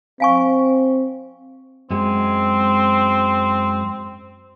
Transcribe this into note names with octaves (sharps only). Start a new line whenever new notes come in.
C4 F5 G#5 C#6
F#2 G#3 C4